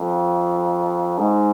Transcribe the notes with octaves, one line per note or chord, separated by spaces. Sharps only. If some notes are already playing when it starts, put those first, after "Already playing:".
Already playing: F2
G#2